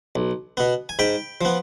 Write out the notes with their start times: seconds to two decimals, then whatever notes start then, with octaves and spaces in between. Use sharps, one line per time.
0.16 B1
0.57 B2 B3
0.89 G#5
0.99 G#2 G5 B5
1.41 F3 B3